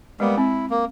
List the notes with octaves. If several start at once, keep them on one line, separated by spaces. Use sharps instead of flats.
G3 G#3 A#3 B3
C4 E4
A#3